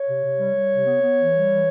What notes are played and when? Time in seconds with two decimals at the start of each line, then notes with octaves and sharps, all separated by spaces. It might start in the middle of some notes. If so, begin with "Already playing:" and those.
Already playing: C#5
0.08 C3
0.24 C3
0.39 G3
0.56 G3
0.71 C3
0.86 B3
1.01 B3
1.18 E3
1.33 G3
1.48 E3